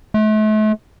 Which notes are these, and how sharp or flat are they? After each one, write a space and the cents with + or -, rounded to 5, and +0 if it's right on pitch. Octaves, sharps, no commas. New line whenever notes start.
A3 -40